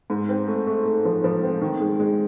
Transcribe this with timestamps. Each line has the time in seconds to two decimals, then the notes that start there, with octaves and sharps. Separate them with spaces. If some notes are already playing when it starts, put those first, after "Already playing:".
0.10 G#2
0.29 C4
0.48 A3
0.67 A3
0.86 A3
1.05 F3
1.24 F3
1.43 C4
1.61 D#3
1.81 G#3
1.99 G#3